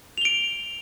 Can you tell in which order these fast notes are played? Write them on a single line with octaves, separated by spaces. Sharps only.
F7 G7 D7